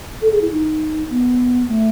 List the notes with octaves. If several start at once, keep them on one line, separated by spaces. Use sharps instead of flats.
A4
G#4
E4
D#4
B3
A3